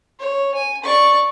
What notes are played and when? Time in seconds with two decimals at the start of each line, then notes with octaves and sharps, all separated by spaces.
0.19 C#5
0.54 G#5
0.84 D5 C#6